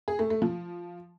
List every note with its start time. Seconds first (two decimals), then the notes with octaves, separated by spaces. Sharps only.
0.08 G#4
0.19 A3
0.30 A3
0.42 F3